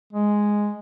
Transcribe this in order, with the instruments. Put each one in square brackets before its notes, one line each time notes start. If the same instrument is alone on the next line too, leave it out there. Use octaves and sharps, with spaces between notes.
[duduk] G#3